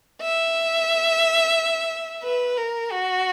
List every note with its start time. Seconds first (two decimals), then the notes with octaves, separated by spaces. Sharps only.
0.21 E5
2.24 B4
2.58 A#4
2.91 F#4